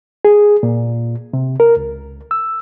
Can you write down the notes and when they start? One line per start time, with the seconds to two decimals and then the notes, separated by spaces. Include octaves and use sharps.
0.25 G#4
0.63 A#2
1.33 C3
1.60 A#4
1.77 C#2
2.31 E6